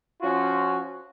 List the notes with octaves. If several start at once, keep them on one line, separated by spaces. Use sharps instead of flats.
F3 C#4 F4 F#4